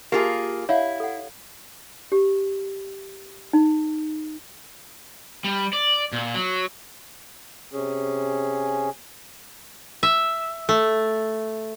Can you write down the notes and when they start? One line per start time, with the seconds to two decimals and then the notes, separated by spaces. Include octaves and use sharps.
0.12 A#3 F4 G4 G#4 A5
0.69 E4 C#5 F5 F#5
1.00 A4 F#5
2.12 G4
3.53 D#4
5.44 G3
5.73 D5
6.12 A#2
6.34 F#3
7.73 C3 C#4 G#4
10.03 E5
10.69 A3